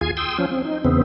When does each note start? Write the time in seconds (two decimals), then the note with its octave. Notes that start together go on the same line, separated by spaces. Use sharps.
0.01 D#2 F4 G#4 G#5 G#6
0.17 G5 C6 D#6 E6
0.38 F3 C#4
0.51 C4
0.65 D#4
0.85 E2 C#3 B3 C4